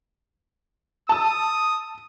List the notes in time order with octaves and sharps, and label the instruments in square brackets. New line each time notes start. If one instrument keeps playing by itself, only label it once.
[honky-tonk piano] A5 E6 [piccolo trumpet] D#6